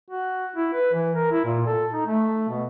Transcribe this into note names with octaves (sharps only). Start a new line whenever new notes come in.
F#4
E4
B4
E3
A#4
E4
A#2
A4
D#4
A3
B2